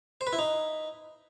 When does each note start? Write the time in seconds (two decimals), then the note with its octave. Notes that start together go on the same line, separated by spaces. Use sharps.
0.21 C5
0.27 B4
0.33 E4
0.39 D#4